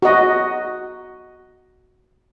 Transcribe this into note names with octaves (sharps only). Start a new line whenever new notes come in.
F#4 D#5